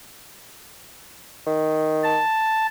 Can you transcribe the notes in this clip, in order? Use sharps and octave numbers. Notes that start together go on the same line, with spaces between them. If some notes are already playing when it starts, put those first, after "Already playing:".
D#3
A5